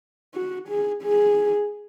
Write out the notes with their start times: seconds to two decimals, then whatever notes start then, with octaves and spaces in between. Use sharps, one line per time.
0.35 F#4
0.68 G#4
1.03 G#4